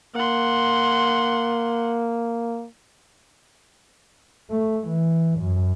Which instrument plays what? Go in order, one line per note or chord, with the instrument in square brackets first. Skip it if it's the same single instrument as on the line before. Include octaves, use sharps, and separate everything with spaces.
[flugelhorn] A#3 [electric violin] F#5 C6
[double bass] A3
E3
F#2